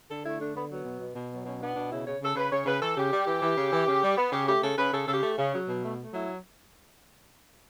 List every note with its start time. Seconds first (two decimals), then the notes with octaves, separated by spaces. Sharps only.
0.09 D3 A4
0.24 A3 E4
0.40 D3 D4
0.55 D3 B3
0.69 F#3 B3
0.85 B2
1.00 B2
1.16 B2
1.30 F#3 B3
1.45 B2 C#4
1.61 B3 D4
1.75 B2 D4
1.91 C#3 E4
2.05 C#3 C#5
2.20 C#3 A4
2.36 C#3 B4
2.51 C#3 C#5
2.65 C#3 B4
2.81 E3 A4
2.96 C#3 G4
3.11 G3
3.26 E3
3.41 E3
3.56 C#3
3.72 E3
3.87 C#3
4.02 G3
4.17 B3
4.31 C#3 G4
4.47 A3 G4
4.62 C#3 A4
4.77 C#3 B4
4.92 C#3 A4
5.07 C#3 A4
5.12 G4
5.22 A3
5.37 C#3
5.53 F#3
5.68 B2
5.83 A3
5.98 A3
6.13 F#3 E4